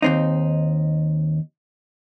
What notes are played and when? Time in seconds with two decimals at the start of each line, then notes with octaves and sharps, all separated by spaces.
0.02 D#2 C4 D#4